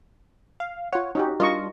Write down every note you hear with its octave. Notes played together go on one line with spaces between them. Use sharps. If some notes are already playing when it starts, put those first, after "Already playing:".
F5
F4 C#5 F#5
C#4 D#4 F#4 G4
G3 D4 F4 A#4 D#5 C#6